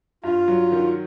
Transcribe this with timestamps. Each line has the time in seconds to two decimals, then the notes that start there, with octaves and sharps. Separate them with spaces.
0.24 G2 F4
0.48 F#3
0.72 D#3